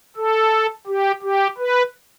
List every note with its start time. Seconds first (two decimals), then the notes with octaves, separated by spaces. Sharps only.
0.17 A4
0.87 G4
1.23 G4
1.58 B4